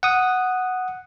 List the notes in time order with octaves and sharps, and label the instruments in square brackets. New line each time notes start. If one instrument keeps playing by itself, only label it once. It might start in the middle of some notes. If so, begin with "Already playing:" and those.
[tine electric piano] F#5 D#6